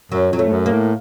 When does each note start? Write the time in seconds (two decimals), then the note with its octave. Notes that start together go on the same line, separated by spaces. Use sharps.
0.12 F#2 F#3
0.32 F2 F#3
0.39 A3
0.48 A2
0.52 F#2
0.66 A#3
0.73 A2